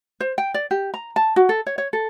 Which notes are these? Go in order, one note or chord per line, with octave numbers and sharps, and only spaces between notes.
C5
G5
D5
G4
A#5
A5
F#4
A4
C#5
C#5
A4